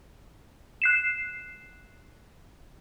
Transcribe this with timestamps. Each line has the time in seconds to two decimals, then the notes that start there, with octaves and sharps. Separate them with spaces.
0.82 F#6 C7 E7